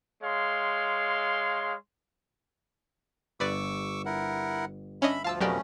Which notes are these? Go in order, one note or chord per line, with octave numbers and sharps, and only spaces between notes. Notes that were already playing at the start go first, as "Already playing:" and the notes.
G#3 C#5 F5 C6
G1 B4 D5 C#6 D6 E6
E4 A#4 F#5
C#4 D4 D#5 E5 B5
D2 F3 F4 F5 A5 E6
F2 B2 F#3 A3 C#4 G4 A#4 D5